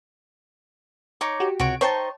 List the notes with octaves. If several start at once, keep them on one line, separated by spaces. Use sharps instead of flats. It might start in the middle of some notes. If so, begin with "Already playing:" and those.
D#4 C#5 D6
F#4 G4
C#2 C3 F#4 C#5 D7
D#4 C5 C#5 G5 A5 C#6